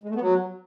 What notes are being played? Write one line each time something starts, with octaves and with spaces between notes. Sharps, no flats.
G#3
A3
B3
F#3